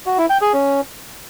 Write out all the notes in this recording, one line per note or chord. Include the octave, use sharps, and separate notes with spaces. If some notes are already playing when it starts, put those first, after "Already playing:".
F#4
E4
G5
G#4
C#4